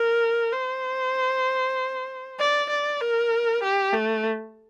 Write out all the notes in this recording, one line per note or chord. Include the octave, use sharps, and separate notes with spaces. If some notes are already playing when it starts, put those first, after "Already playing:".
Already playing: A#4
C5
D5
D5
A#4
G4
A3